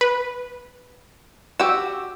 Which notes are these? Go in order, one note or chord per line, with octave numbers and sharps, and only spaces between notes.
B4
F#4 G4 E6